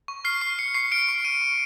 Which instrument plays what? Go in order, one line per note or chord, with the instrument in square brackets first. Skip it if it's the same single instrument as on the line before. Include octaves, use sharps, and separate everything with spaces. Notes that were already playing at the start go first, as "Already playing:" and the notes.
[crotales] C#6
F6 C7
C#6 C7
F6 C#7
C#6 C7
F6 D7
C#6
F6 D#7
C#6